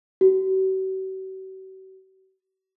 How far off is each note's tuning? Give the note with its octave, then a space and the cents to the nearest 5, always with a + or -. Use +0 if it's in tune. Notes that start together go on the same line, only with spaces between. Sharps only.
F#4 +45